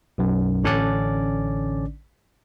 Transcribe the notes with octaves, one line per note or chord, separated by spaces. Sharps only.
B1 F#2
A1 D3 C#4 D4 D5